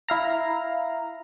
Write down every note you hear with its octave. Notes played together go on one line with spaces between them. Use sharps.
E4 F5 A#5